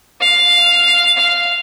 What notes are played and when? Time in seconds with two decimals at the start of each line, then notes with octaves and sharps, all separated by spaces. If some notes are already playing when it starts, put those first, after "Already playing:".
0.20 F5
1.17 F5